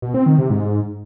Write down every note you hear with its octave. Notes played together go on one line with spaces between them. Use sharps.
B2
C4
D#3
C3
G#2